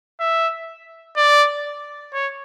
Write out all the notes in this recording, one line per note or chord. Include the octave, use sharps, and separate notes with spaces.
E5
D5
C#5